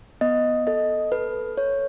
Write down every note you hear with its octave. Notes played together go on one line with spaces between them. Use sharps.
B3 D#5
A4 D#5
A4 B4
A4 C#5